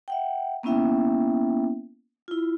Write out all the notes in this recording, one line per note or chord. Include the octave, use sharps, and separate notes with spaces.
E5 F#5 G5
A#3 B3 C#4 E4 E5 G5
E4 F4